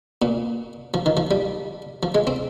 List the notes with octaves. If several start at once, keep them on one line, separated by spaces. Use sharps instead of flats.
A#2
F3
D#3
F3
G3
F3
G#3
C4